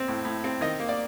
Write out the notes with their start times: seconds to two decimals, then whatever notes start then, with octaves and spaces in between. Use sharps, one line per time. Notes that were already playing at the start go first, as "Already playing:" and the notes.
Already playing: C4
0.08 A2
0.25 A2
0.44 C4
0.61 D#3 D#5
0.80 A#3
0.89 D5